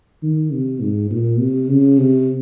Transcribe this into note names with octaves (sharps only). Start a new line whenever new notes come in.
D#3
C3
G#2
A#2
C3
C#3
C3